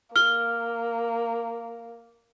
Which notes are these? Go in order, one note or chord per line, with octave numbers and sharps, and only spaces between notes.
A#3 F6 G7